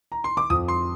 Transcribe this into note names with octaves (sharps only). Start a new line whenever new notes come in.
A#5
C6
D6
F2 D#6
C6